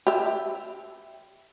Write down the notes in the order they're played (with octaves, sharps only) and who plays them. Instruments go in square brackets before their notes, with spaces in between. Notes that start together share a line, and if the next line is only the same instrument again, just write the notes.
[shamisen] G4 E5